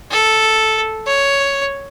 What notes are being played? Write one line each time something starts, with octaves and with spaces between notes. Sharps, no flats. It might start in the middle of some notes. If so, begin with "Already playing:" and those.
A4
C#5